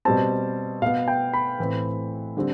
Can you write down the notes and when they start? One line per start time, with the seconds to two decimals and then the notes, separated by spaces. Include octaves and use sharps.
0.05 B2 G3 C4 A5
0.82 B2 B3 F5
1.08 G5
1.34 B5
1.59 A2 E3 A3 C4
2.37 D3 G3 C4